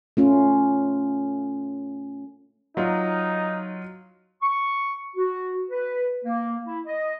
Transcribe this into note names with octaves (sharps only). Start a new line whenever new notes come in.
A3 C#4 F4
F#3 D#4 F4
C#6
F#4
B4
A#3
E4
D#5